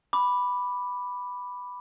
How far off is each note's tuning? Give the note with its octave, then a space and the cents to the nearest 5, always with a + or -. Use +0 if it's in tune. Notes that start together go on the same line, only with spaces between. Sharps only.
B5 +0 D6 +5